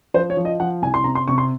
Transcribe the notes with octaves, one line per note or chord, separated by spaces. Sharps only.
F3 C5
C#5
F3
D#5
F3 F#5
C2 G#5
C6
C3 A#5
C6
C3 C#6
C6